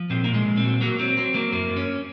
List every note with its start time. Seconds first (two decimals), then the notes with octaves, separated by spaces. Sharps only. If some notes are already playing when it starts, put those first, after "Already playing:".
Already playing: F3
0.10 A#2 C4
0.24 A#3
0.29 A#2
0.34 G#3
0.45 A#2
0.57 C4
0.64 F#3
0.81 F#3 A#3
0.99 F#3 C4
1.17 F#3 C4
1.34 F#3 A#3
1.52 F#2 A#3
1.70 F#2
1.76 C#4